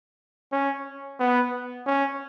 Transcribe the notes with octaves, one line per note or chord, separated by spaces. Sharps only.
C#4
B3
C#4